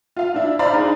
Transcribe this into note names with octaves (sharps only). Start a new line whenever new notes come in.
F4 F5
D4 E4
C5 D5 F5 A#5 B5
D4 D#4 G#4